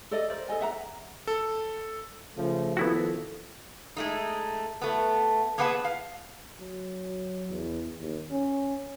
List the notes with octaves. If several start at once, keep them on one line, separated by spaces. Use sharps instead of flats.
A4 D5 D#5
A#4 C5 D5
A4 D#5 G#5
E5 F#5 A#5
A4
C#3 F3 A3
D#3 F3 B3 E4 F#4 A4
G#3 A3 D#4
A3 B3
A#3 B3 G#4 B4 F#5 A5
F5
F#3
E2
D#2
C#4